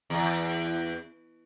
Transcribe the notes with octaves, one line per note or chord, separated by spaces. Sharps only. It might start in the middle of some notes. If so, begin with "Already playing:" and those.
E2